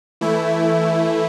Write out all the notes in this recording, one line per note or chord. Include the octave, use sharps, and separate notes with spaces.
E3 A3 E4